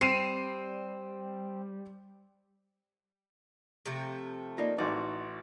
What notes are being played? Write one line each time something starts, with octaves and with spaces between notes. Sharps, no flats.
G3 C4 C7 D#7 E7
C3 F3 A3
A#3 D#4 F4 D5 D#5
A1 D#4 F#4 B4 D5 C6